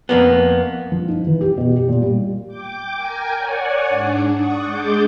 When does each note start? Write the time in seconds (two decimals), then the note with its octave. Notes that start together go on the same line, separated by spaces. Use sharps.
0.09 F2 A#3 B3
0.92 F3
1.08 D#4
1.27 E3
1.41 G4
1.58 B2
1.77 G4
1.89 A#2
2.02 G3
2.47 G5 D6
2.93 A#4 G5 G#5
3.37 C#5 D5 F#5 G#5
3.89 G#2 D4
4.34 D5 F#5 C#6 D#6
4.64 G#3 D4 G#4 D6 G6 A6